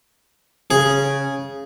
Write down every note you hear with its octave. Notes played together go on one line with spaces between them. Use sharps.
C#3 G#4